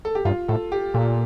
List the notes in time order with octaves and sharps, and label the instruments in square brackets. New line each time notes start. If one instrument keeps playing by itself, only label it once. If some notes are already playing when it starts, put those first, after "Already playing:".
[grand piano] A4
G4
[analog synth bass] G2 [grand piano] F4
[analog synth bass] A2 [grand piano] A4
[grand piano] G4
[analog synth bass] A#2 [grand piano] A4